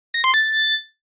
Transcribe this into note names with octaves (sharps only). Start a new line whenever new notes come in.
A#6
C6
A6